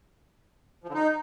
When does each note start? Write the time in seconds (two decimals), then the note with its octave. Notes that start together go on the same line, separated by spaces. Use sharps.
0.84 F3
0.89 D3
0.95 D#4